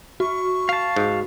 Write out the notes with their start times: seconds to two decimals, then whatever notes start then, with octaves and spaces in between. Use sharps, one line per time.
0.20 F#4 C#6
0.69 F5 A5
0.96 G#2